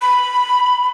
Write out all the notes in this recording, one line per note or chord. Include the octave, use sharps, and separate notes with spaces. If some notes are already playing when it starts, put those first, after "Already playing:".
B5